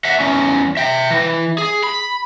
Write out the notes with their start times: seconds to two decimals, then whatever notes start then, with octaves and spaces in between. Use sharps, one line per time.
0.05 E5 F#5
0.20 E2 C#4
0.77 E5 G5
1.11 E3
1.58 G#4
1.84 B5